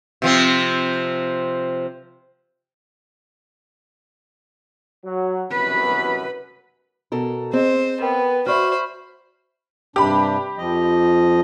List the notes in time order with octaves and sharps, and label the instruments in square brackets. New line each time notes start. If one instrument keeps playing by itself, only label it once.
[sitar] C3 F3 C4
[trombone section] F#3
[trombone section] C2 F#2 B2 [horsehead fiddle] B4 B5
[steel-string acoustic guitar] B2 A4 A#4
[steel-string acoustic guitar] C4 [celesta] G#4 D#5 [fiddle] C5
[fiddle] B3 [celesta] A#4 B4 G5
[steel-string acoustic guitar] F#4 D5 [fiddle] C5 B5 [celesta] E5 C#6 F6
[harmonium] G2 C3 D4 [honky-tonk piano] G4 B5
[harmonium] F2 F3 D#5